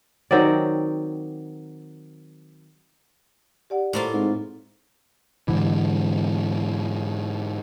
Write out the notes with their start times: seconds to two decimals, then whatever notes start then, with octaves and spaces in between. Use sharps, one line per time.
0.31 D#3 F#3 C4 D5
3.70 G4 D5 F#5
3.93 A2 A#3 F4 A4 C5 C6
4.13 G#2 C4
5.48 G#2 D3 E3